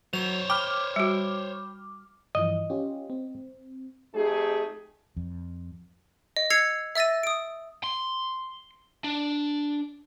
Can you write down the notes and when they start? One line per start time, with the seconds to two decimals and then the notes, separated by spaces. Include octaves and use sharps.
0.13 F#3 C5 C#5 F7
0.50 G5 B5 D6 F6
0.96 G3 F#4
2.35 G2 E3 F3 D#5
2.70 C#4 F4 G4
3.10 C4
4.14 F2 A3 D#4 G4 G#4
5.17 F2
6.36 D#5
6.50 E6 G#6 C7 C#7 F7
6.95 E5 E6 A6 A#6 D#7
7.23 D#6 D7
7.84 C6
9.04 D4